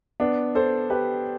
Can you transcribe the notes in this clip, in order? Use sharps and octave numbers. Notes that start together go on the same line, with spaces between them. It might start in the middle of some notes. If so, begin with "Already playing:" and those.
B3 D4
A4 C5
G4 B4